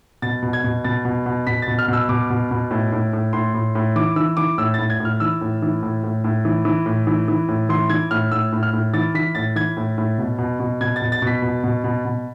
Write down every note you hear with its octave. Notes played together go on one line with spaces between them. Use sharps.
B2 A6
B2
G#6
B2
B2 A6
B2
B2
B2 B6
A6
B2
F6
B2 E6
B2 D6
B2
B2
A2
A2
A2
A2 C6
A2
A2
E3 D6
E3 E6
E3 D6
A2 E6
A2 A6
G#6
A2
F6
E3 E6
A2
E3
A2
A2
A2
E3
E3
A2
E3
E3
A2
E3 C6
E3 G#6
A2 F6
A2 E6
A2
F6
A2
E3 A6
E3 B6
A2 A6
E3 G#6
A2
A2
B2
B2
B2
B2 G#6
A6
B2
A6
B2 B6
B2
B2
B2
B2